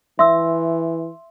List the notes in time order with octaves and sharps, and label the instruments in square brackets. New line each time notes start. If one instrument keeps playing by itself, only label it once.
[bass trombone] E3 [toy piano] E5 E6 [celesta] C6